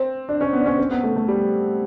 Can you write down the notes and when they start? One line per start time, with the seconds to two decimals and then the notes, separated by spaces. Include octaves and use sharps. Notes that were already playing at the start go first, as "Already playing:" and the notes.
Already playing: C4
0.29 D4
0.41 C#4
0.53 B3
0.60 D4
0.66 C#4
0.78 C4
0.91 B3
1.04 A3
1.16 A3
1.28 G3